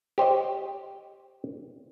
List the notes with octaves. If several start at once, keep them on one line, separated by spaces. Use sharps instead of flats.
G4 C5 C#5 D#5